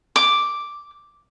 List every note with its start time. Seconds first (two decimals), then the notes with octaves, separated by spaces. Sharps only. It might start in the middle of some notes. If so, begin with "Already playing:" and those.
0.16 D6